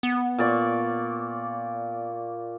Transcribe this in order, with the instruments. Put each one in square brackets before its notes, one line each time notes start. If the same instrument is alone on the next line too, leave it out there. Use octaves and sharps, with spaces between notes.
[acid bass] B3
[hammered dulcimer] A#2 D5 C#6